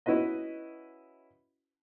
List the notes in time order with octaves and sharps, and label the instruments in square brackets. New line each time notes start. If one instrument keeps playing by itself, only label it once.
[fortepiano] C#4 E4 F#4 B4 D#5